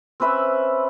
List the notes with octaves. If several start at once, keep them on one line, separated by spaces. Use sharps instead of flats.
C4 C#4 B4 E5